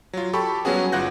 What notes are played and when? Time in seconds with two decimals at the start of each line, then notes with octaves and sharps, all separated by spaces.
0.13 F#3 F4
0.33 G4 A4 A5 B5 C#6
0.65 F#3 G3 B3 C#4 F#4 G#4
0.92 G1 F4 F#5 F#6 G6 A#6